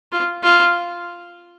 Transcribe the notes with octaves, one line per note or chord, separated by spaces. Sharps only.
F4
F4